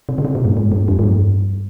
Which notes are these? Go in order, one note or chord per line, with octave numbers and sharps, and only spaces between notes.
C3
C#3
C3
A#2
G2
G#2
G2
F2
G#2
G2